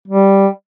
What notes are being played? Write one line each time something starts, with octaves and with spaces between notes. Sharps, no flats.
G3